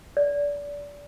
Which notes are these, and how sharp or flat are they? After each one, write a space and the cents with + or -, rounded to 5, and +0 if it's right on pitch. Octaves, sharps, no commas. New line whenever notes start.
D5 -25